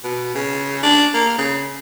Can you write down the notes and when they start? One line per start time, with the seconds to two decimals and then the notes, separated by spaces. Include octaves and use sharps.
0.04 B2
0.35 C#3
0.83 D4
1.14 A#3
1.38 C#3